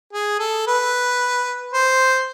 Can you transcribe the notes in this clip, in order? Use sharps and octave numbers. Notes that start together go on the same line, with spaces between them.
G#4
A4
B4
C5